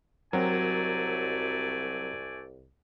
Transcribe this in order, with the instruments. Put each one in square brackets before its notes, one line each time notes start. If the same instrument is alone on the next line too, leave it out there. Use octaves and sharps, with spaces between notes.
[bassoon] C2 [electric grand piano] F#3 [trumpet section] A3 D5 G#5 [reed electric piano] C4 F#4 A#4